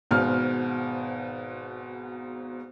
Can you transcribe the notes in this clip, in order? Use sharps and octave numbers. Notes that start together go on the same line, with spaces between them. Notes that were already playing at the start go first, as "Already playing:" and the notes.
G#1 G#2 B2 F6